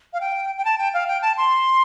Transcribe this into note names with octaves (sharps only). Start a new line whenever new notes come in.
F5
G5
G5
A5
G5
F5
G5
A5
C6